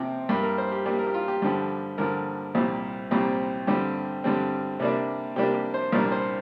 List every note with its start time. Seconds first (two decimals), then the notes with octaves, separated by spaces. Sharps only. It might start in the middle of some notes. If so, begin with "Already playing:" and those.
Already playing: C3 F3 C4
0.29 G2 G3 A#3 G4
0.43 A#4
0.58 C5
0.72 G4
0.86 G2 G3 A#3 G4
0.99 A#4
1.07 G4
1.14 F4
1.28 G4
1.42 G2 D3 F3 G4
1.98 G2 D3 F3 A#4
2.55 C2 A#2 G3 C4
3.11 C2 A#2 G3 C4
3.67 G2 D3 G3 C4 G4
4.24 G2 D3 G3 C4
4.80 C3 G3 A#3 D4
5.36 C3 G3 A#3 D4 G4
5.54 G4
5.74 C5
5.92 C2 A#2 G3 A#3 D4 A#4
6.12 C5